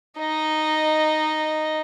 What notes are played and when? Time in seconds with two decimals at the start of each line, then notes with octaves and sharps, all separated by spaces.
0.19 D#4 D#5